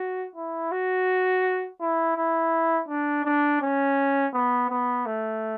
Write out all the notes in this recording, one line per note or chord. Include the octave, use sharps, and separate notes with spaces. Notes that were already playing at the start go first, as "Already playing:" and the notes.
Already playing: F#4
E4
F#4
E4
E4
D4
D4
C#4
B3
B3
A3